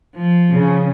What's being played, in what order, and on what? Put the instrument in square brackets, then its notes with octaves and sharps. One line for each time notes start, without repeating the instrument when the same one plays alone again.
[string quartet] F3
[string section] C#3